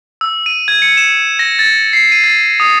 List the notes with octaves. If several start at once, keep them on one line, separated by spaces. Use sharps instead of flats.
E6
D#7
G#6
C#7
E7
A#6
A6
C7
D#7
A6
D#6